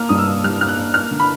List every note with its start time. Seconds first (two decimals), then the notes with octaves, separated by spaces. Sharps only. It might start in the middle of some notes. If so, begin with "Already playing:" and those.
Already playing: A#3 F6
0.09 G2 D#6
0.18 E6
0.27 A#3
0.44 G3 F6
0.60 A#3 F6
0.68 F#6
0.77 A#3
0.94 A#3 F6
1.11 D3
1.20 B5